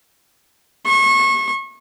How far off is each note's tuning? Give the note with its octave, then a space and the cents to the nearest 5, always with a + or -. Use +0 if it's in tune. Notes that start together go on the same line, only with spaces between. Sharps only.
C#6 -30